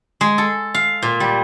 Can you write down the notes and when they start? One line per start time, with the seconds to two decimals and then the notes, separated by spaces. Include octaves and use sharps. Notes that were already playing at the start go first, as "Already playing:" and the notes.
0.21 G#3
0.38 A4
0.74 F5
1.02 A#2
1.20 G3